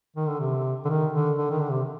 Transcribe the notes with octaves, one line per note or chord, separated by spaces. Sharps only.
D#3
D3
C3
D3
D#3
D3
D3
D#3
D3
C3